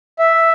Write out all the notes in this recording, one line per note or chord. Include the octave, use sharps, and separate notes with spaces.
E5